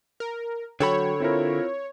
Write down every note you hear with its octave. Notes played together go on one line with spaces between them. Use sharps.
A#4
D3 F#3 A4 C#5 G5 B5 C#6
C4 E4 F4 A#4